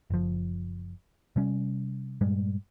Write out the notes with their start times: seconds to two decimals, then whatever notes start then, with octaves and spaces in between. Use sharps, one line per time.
0.10 F#1 F3
1.36 C3 G3 C#4
2.21 G2 A#2 G3 G#3